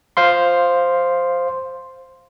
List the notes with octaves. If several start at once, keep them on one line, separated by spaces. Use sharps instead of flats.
C5 F5 C6